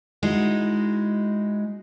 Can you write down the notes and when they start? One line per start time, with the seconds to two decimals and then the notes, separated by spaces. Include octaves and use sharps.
0.23 G#3 D#4 E4 F#4